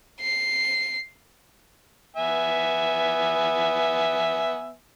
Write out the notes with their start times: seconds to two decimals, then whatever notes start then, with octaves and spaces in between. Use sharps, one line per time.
0.21 C7
2.17 B3 E5 G#5